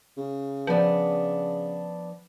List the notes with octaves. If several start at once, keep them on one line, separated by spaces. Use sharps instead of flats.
C#3
F3 B3 D4